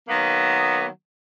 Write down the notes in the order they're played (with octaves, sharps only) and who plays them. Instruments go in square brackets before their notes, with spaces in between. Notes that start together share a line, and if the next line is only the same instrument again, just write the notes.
[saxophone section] D#3 F#3 A#3 B3